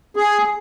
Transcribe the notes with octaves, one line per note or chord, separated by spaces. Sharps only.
G#4